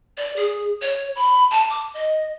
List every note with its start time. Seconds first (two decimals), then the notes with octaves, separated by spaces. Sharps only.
0.17 D5
0.36 G#4
0.82 C#5
1.16 B5
1.51 A5
1.70 D6
1.94 D#5